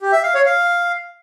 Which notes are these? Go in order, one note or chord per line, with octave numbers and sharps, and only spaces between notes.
G4
E5
F5
C#5
F5